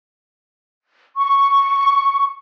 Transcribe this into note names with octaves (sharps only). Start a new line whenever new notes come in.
C#6